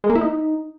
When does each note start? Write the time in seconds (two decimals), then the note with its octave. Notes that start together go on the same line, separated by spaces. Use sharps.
0.04 G#3
0.10 A#3
0.15 E4
0.21 D#4